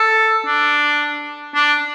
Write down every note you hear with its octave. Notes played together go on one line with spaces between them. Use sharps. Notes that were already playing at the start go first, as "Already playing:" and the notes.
Already playing: A4
D4
D4